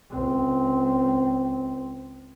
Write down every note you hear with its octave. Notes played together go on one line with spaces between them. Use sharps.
C#2 C4